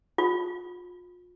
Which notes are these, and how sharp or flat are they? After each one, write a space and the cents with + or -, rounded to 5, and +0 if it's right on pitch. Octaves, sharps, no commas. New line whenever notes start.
F4 +35